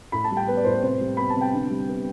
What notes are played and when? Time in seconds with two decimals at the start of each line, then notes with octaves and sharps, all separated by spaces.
0.12 A2 B5
0.24 A5
0.31 G3
0.37 G5
0.47 B3 B4
0.57 D5
0.65 A2 C5
0.73 B4
0.82 C3 C5
1.01 G3
1.17 B3 B5
1.30 A5
1.35 C3
1.41 G5
1.53 D3
1.70 G3
1.88 B3